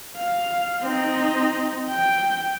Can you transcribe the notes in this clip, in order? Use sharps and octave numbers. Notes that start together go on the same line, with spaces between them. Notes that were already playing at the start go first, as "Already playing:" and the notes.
F5
C4 D#4
G5